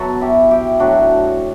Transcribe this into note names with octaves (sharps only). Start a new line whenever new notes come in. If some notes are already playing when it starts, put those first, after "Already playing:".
Already playing: B2 F#3 F#4 A4
E4 G4
E4 G4
A2 F#3 D4 F#4